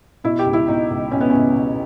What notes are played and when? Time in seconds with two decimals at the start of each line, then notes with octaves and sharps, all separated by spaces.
0.24 B2 E4
0.39 G4
0.46 C#2
0.53 E4
0.68 B2 D#4
0.90 C#2
1.11 B2 C#4
1.21 B3
1.30 C#2 C#4
1.55 B2